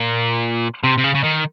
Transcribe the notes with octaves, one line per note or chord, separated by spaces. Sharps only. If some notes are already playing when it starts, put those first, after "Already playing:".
Already playing: A#2
C3
C3
C#3
C#3
D#3